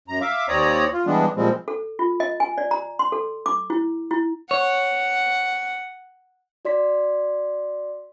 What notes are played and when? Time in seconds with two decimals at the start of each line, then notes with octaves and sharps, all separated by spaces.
0.08 F#2 A#5
0.21 E5 F5 D6
0.48 D#2 C4 C#5 D5 A#5 D#6
0.93 F4
1.06 E3 G3 G#3 B3 D4
1.36 A#2 F3 G3 G#3 C4
1.68 A4
1.99 F4
2.20 D#5
2.40 G#5
2.58 D5
2.71 A#5
2.99 C6
3.12 A4
3.46 D6
3.70 E4
4.11 E4
4.51 C#5 F#5
6.65 F#4 D5 C6 B6